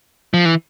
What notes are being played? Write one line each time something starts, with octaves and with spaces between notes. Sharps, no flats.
F3
E3